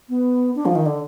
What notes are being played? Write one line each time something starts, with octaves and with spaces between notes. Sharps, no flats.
B3
D4
F3
D#3
D3